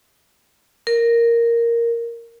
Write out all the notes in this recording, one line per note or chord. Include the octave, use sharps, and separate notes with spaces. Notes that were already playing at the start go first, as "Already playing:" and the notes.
A#4